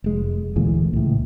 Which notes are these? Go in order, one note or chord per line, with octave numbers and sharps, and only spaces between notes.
F1 G#3
D2 A#2 E3 G#3
C#2 A2